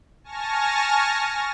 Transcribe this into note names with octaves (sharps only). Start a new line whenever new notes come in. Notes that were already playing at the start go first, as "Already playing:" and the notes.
G#5 A5 C#6 F6 A#6